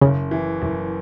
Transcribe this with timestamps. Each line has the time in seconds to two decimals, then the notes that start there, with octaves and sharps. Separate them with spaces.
0.01 F#1 C#3
0.31 E3
0.62 F#1